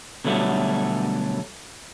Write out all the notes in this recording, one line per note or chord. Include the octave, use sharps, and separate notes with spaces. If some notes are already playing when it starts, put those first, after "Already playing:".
B2 D3 F#3 G3 A3